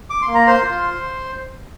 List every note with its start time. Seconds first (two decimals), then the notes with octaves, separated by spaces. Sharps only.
0.10 D6
0.22 C6
0.27 A#3
0.34 A#5
0.47 C5 C6
0.62 F4